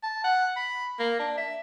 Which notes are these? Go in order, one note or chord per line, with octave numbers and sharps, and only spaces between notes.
A5
F#5
B5
A#3
D4
E5